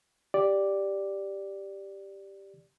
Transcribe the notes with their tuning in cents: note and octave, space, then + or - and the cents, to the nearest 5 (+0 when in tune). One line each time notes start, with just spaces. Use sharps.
G4 +0 D5 +0